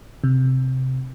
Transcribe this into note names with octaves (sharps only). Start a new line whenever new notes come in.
C3